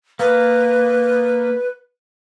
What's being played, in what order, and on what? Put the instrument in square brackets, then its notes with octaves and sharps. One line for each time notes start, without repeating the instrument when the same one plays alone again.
[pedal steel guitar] A#3 [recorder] B4